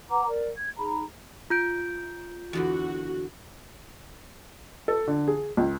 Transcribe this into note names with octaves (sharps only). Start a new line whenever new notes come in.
B4 F#5 A#5 D6
A#4 D5
G#6
D#4 G#4 A#5 B5
F4 G6 D7
E2 D3 E3 F#4
A4
D3
G#4
C#2